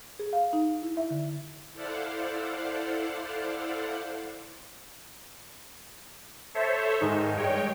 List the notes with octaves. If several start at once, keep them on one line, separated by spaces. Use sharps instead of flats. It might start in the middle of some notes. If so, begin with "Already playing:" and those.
G#4
F5
D#4
E4
E5
D3
E4 A4 C5 D5 F5 F#5
A4 C5 C#5 E5
G#2 D#3 G#3 D#4
G2 G#3 C#5 G5